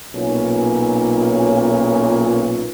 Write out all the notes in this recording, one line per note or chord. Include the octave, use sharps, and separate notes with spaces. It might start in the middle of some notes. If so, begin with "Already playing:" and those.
B1 A#2 C#4